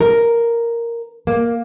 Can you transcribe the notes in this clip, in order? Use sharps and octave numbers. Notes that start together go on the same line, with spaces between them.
A#4
A#3